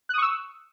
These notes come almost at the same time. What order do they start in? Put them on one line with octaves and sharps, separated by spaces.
F#6 D#6 C#6 E6